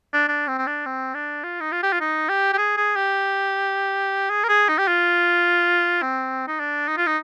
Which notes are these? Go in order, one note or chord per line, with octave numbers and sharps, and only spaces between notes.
D4
D4
C4
C4
D4
C4
D4
F4
D#4
F4
G4
F4
D#4
G4
G4
G#4
G#4
G4
G#4
A#4
G#4
D#4
G4
F4
C4
D#4
D4
D#4
F4
D#4